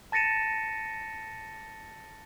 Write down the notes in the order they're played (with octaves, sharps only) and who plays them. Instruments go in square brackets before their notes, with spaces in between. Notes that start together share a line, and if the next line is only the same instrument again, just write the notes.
[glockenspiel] A5 A6 A#6 C#7 D#7 E7